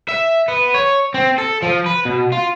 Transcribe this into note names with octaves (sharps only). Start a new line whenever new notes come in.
E5
B3
C#5
C4
A4
F3
B4
B2
F4